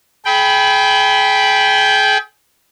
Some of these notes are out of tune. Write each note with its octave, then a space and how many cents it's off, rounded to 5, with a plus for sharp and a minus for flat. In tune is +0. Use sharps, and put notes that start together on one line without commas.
G#4 +35 G5 +0 B5 +0